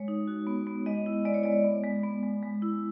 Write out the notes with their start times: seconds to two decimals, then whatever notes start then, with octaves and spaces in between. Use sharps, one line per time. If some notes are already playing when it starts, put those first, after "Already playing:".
Already playing: G#3 C#5
0.08 D#4
0.28 F#4
0.47 B3
0.67 B3
0.86 G#3 D#5
1.06 E4
1.25 G#3 D5
1.34 C#5
1.43 G#3 D5
1.64 B3
1.84 G#3
2.04 B3
2.23 G#3
2.43 G#3
2.62 E4